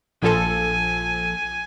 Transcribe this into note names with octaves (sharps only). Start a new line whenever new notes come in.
A#1 F3 A4 G#5